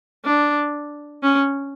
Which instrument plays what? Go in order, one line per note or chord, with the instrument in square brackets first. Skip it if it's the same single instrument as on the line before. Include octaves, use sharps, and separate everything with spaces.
[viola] D4
C#4